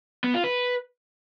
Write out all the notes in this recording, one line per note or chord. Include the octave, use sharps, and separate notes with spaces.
B3
F4
B4